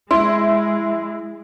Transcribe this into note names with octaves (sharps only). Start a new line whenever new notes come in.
G#3 E4 C6